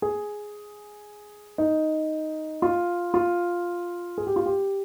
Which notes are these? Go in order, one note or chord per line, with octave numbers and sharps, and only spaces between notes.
G#4
D#4
F4
F4
G#4
G4
F4
G4